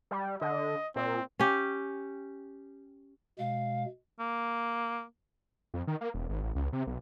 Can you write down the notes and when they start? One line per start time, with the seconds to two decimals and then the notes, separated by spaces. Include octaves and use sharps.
0.11 G3
0.41 D3 D#5
0.96 A#2 C4
1.40 C#4 G4
3.39 B2 G#3 F5
4.20 A#3
5.74 F2
5.87 D#3
6.01 A#3
6.14 E1
6.29 G#1
6.43 A1
6.55 C#2
6.73 C3
6.87 B1